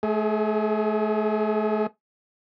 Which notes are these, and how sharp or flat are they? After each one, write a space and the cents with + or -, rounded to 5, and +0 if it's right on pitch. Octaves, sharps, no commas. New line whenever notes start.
A3 -35 G#4 +15